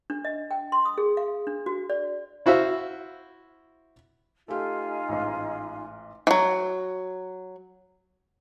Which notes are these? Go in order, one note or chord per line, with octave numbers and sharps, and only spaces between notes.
D4
D#5
G5
C6
D#6
G#4
F5
D4
F#4
D5
E4 F#4 C5 E5 F5
A3 D#4 F4 G4 G#5
A1 G#2
E3 F#3